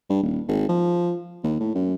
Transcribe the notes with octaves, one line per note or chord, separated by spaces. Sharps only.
G2
D#1
G#1
F3
D#2
A2
F#2